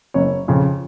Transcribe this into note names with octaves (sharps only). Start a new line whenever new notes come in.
F#1 C#5
F2 C#3